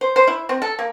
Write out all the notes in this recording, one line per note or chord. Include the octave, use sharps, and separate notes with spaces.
C5
C5
E4
C4
A4
A#3